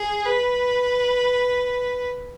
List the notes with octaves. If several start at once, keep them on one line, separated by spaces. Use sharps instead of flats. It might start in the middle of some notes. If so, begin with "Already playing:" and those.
Already playing: G#4
B4